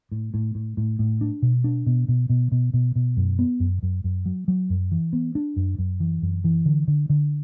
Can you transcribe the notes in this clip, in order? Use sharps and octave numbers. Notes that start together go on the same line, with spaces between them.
A2
A2
A2
A2
A2
D4
B2
D4
B2
B2
B2
B2
B2
B2
F#2
B3
F#2
F#2
F#2
F#3
F#3
F#2
E3
B3
D4
F#2
F#2
E3
F#2
E3
D3
D3
D3